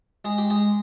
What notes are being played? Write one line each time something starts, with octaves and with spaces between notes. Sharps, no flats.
G#3 G#4
G4
G#3 G#4